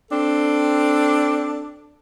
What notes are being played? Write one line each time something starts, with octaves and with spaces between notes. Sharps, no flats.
C4 D4 A4